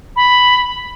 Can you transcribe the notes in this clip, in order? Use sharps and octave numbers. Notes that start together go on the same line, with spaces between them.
B5